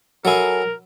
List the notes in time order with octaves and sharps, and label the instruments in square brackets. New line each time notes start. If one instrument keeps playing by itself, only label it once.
[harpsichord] F#3 E4 [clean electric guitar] A4 G#5 [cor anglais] A#4